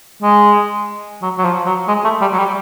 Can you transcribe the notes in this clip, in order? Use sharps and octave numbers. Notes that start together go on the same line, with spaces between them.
G#3
F#3
F#3
F3
F#3
G#3
A3
G3
F#3
G3